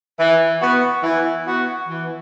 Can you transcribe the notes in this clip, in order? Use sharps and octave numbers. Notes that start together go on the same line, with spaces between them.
E3
B3 F#4
E3
B3 F#4
E3